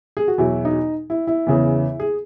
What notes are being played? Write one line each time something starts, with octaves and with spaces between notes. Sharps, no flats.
G#4
F#4
E2 B2 F#3 E4
D#4
E4
E4
E2 C#3 E3
G#4